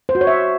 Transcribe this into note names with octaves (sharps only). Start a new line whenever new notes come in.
C5
F#4
C#5
E5